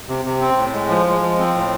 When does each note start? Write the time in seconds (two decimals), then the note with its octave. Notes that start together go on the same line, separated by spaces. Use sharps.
0.09 C3
0.25 C3
0.41 C4
0.57 A2
0.73 G#3
0.89 F3
1.06 G#3
1.22 F3
1.39 C4
1.55 A2